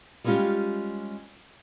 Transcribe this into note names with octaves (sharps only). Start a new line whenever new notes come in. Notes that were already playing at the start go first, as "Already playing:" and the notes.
G3 G#3 B3 C#4 F4 G4